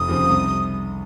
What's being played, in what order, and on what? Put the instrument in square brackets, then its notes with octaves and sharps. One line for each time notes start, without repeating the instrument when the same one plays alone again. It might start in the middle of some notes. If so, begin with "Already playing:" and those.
Already playing: [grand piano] F1 [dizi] D#6
[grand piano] D#2 C#3 F3 C4
C2